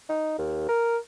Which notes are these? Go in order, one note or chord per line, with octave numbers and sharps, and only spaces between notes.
D#4
D#2
A#4